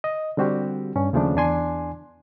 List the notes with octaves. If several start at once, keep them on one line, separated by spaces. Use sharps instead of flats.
D#5
D3 G3 C4 F#4 G4
G2 C#4
D#2 C#3 F3 A3 D4
E2 E3 D4 G#5 C6